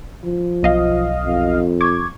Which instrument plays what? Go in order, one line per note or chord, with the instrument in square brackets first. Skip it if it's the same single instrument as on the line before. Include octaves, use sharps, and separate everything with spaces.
[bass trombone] F3
[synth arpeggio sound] B1 D#5 F5
[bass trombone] F2
[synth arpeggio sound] C#6 D6 G#6